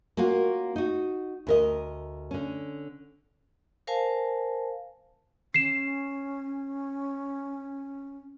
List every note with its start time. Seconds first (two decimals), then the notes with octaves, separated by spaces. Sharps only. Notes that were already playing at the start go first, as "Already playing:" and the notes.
0.17 A#3 C#4 F4 F#4 A#4
0.76 D#4 F#4
1.47 D2 A#4 D#5
2.31 D3 C#4
3.87 A#4 C5 F5 G#5 A5
5.54 C#4 C7 E7